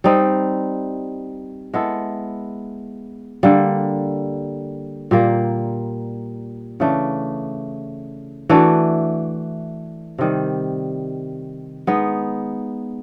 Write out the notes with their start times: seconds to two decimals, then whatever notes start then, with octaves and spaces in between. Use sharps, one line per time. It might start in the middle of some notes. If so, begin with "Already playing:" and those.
0.04 G3 C4 D#4
1.74 G#3 B3 E4 A4
3.43 D3 G3 A#3
5.11 A#2 G3 A#3
6.80 C#3 E3 A3 D4
8.49 E3 A3 D4 F#4
10.18 C3 D#3 G3
11.87 G#3 B3 D#4